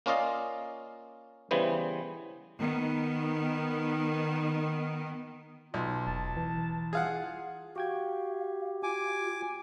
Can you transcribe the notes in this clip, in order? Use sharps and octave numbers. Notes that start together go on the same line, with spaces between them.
A#3 C#4 F4 D5 D#5 F5
C#3 E3 G3 B3 C5
D#3 B3
B1 F4
E1 A5
E3
F4 G#4 F5 F#5
F#4 G4 F5 G5 G#6
F4 G#5 D6